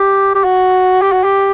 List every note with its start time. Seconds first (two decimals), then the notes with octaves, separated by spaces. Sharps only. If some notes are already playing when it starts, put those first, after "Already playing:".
Already playing: G4
0.35 G4
0.44 F#4
1.02 G4
1.12 F#4
1.24 G4